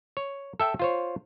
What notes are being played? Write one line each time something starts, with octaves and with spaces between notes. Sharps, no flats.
C#5
A4 E5 G5
F4 C5 C#5